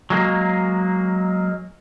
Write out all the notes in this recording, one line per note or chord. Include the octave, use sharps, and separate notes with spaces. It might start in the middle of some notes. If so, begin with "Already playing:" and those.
F#3 G#3 A#3